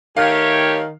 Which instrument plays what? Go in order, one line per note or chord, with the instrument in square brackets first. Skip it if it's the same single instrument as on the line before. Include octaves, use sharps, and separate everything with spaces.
[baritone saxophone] D#3 [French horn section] A3 G4 C#5 [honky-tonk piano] F5